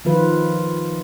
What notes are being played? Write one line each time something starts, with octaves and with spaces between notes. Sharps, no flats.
D#3 F3 F4 B4